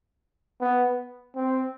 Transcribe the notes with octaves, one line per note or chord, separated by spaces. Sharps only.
B3
C4